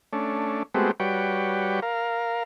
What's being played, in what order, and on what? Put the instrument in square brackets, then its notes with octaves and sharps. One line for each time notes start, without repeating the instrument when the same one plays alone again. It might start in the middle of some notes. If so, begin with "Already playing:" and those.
[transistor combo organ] A3 C#4 D4
G#3 A3 B3 C4 F#4 G4
G3 F#4 B4 C#5 D5 G5
A#4 F5